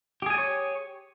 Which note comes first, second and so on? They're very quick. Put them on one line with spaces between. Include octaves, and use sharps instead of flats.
G4 G#4 G#5 D5 C#5